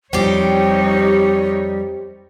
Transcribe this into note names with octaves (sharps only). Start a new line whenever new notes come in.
F2 F3 G3 C4 D#4 G4 C#5